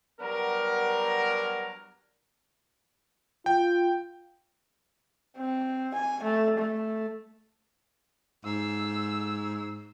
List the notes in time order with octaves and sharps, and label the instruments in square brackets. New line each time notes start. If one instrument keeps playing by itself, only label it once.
[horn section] F#3 G3 B3 D4 A#4
[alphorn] F4 [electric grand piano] G5
[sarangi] C4
G#5
A3
A3
[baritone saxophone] G#2 [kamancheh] E6